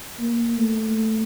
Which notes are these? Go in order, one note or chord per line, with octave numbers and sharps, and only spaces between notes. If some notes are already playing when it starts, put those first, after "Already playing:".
A#3
A3